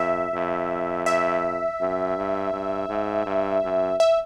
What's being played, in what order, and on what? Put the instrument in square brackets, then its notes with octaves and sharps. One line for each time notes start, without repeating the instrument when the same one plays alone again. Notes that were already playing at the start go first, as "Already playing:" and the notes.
Already playing: [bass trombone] F2 [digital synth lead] E5
[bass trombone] F2
[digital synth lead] E5
[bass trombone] F#2
G2
G2
G#2
G2
F#2
[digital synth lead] E5